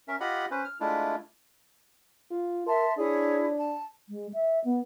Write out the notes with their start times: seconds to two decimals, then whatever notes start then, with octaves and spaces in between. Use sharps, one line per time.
0.08 C#4 A#4 E5
0.20 F4 G4 D#5 F#5 B5
0.51 C#4 B4 C5
0.65 F6
0.80 G#3 A3 D4 E4 F4
2.31 F4
2.66 A#4 E5 A5 C6
2.98 D4 E4 G#4 C#5
3.56 A5
4.09 G#3
4.33 E5
4.65 B3